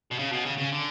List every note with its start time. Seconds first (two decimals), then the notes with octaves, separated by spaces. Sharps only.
0.11 B2
0.19 C#3
0.33 B2
0.46 C#3
0.58 C#3
0.72 D3